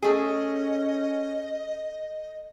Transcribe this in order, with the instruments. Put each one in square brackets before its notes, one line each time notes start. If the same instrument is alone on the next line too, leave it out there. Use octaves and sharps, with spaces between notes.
[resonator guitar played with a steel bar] A3 G#4 [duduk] C#4 [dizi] D#5